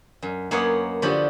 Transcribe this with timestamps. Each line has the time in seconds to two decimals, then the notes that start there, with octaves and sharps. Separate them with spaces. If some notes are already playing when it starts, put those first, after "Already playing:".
0.22 F#2
0.51 F#2 A#3 B3 C#5 D#5 F#5
1.02 D3 F3 B3 F#4 G4 A4